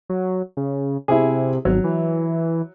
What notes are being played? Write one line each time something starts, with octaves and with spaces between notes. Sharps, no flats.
F#3
C#3
C3 E4 G#4
G#1 F#3
E3